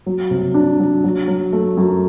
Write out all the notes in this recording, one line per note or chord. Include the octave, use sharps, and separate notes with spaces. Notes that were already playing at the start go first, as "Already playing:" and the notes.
F#3
C3
D4
F#3
F#3
F#3
A3
F#2